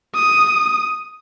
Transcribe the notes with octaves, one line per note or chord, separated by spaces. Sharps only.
D#6